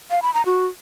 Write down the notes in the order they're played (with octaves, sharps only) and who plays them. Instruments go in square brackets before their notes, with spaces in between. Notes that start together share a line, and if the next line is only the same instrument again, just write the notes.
[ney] F5
B5
A#5
F#4